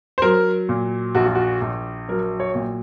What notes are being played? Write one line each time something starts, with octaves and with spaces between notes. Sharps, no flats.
C5
F#3 A#4
A#2
A#1 F#4
F4
F#4
A#1
F#3 A#4
C#5
A#2